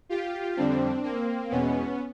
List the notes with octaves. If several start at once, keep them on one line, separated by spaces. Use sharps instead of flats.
F4 G4
F2 D3 G3 C4 D4
A#3 C4
E2 B2 G#3 B3 C#4